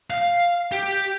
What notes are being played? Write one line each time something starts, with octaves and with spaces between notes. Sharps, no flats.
F5
G4